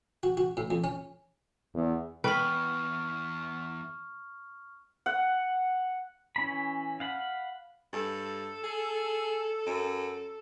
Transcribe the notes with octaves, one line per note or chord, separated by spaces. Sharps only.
F#4
F#4
A2
F2
C#4
E2
E2 B4 G5 B5 C#6 F6
F#5
E3 C#4 B5
F5 F#5 B5
G2 A4
G#4
F#2